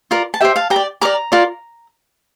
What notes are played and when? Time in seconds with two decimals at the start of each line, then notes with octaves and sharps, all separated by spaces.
0.11 F4 A#4 D5
0.34 A5
0.41 G4 C5 E5 G5
0.56 F5 A5
0.70 G4 G5 A#5
0.76 D5
1.01 G4 A#4 D5 A#5 D6
1.32 F4 A#4 D5